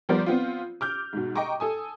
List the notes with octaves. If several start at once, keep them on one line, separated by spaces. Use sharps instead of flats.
F3 G3 B3 A#4 C5 D5
B3 C4 F4
D6 F6 G6
G#2 B2
D#5 G5 A#5 C#6 D6
A4 G#5 D#6